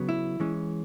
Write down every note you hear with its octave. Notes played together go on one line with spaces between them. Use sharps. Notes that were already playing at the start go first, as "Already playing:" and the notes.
Already playing: C#3 F#3 B3
E4
E3 G#3 C#4